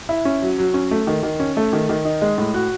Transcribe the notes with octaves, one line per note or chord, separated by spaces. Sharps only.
E4
C#4
F#3
F#3
C#4
A3
D#3
D#3
C#4
A3
D#3
D#3
D#4
G#3
A2
F#4